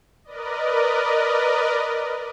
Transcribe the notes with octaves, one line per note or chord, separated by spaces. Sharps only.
A#4 B4 D5 D#5